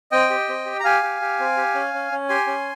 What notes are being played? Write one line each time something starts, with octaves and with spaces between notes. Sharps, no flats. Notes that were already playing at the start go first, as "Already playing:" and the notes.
C4 D#5 G5
G4
C4
G4
A#5
G4 F5 G#5
G4
G4
C4
G4
C#4
C#4
C#4
G4 G#5 C6
C#4